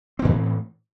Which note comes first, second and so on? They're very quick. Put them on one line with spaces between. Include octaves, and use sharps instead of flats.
C4 E3 A2